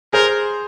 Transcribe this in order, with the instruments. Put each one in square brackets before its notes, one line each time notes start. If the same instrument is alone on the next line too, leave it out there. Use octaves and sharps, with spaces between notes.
[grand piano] G#4 C5 [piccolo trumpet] A#4